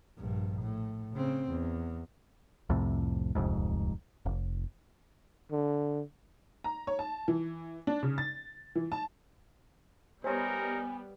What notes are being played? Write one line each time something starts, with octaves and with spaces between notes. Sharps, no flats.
A#1 G2
A2
C#3 C4
E2
C2 F2 A2 C3
D1 C2 F2 G#2
F1
D3
A#5
C#5
A5
E3
D4
C#3
A6
E3
A5
G3 B3 D#4 A#4 C5 C#5 G#5